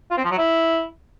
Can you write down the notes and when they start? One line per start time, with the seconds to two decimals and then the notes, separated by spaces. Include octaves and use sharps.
0.11 F4
0.18 C4
0.24 F3
0.31 F#3
0.38 E4